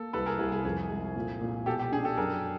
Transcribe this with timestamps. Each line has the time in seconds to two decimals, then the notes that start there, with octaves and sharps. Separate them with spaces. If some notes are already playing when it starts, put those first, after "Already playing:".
Already playing: A#3 A4
0.13 C2 A4 B4
0.26 G#4 A#4
0.39 C2 G#4
0.52 G#4
0.65 F2 G#4
0.90 G#3
1.16 A#2
1.41 A#2
1.66 B2 G4 A4
1.79 G4
1.92 D4 G#4
2.04 G4 A4
2.17 F#2 G#4 A#4